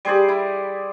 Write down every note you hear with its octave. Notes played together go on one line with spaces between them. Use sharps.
G3 G#4 C5 D5
E4